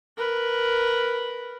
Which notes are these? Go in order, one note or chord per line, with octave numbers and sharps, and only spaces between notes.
A#4 B4